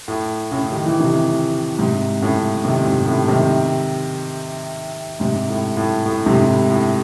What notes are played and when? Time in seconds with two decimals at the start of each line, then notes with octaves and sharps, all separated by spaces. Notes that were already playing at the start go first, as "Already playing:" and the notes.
0.08 A2
0.51 A2 C#3
0.72 D#3
0.86 E3
1.00 C3 D#3
1.79 G#2 C3
2.21 A2 C#3
2.65 C3 D#3
2.85 G#2 C3
3.06 A2 C#3
3.28 C3 D#3
5.20 G#2 C3
5.49 A2
5.77 A2
6.06 A2
6.26 G#2 C3
6.49 A2
6.70 A2